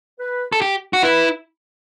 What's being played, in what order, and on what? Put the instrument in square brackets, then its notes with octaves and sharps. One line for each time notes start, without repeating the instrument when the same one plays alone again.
[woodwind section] B4
[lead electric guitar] A4
G4
F#4
[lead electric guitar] E4 [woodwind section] B4